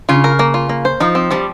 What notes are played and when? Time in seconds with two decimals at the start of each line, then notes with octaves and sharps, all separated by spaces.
0.09 C#3 F4
0.24 A#4
0.39 A#3
0.54 F4
0.69 A#3
0.85 C5
1.00 F3 D#4
1.15 C4
1.31 F3 G3